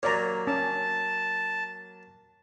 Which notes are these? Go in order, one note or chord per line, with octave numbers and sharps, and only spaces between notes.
F#3 A#3 C#5 D5 A#5
C#4 A5